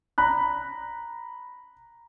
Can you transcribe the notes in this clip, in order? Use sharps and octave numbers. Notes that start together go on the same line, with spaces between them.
A#5 B5 F#6